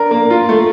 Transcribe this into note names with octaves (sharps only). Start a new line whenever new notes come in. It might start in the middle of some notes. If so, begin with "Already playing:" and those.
Already playing: D4 A#4
A#3
F4
A3